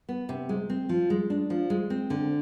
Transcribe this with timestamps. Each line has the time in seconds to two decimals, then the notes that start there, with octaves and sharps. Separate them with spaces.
0.09 B3
0.29 C3
0.49 G#3
0.70 C4
0.89 F3
1.10 G#3
1.30 D4
1.50 F3
1.70 G#3
1.90 C4
2.10 D3